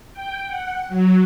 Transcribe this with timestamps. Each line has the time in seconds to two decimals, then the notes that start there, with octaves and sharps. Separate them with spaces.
0.13 G5
0.47 F#5
0.88 F#3